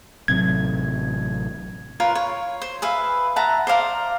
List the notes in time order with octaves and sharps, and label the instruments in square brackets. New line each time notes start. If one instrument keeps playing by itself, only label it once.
[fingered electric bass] A1 C3 F#3 [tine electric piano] G#6
[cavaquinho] F4 A#4 B4 C#5
C#5
C5
G#4 B4 E5 F5
E5 F#5 A5 A#5
C5 D5 F5 A#5